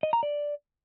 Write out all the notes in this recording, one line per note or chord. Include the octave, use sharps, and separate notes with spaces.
D#5
A#5
D5